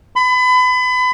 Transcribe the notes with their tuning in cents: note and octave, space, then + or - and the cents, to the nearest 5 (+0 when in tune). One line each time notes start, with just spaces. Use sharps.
B5 +30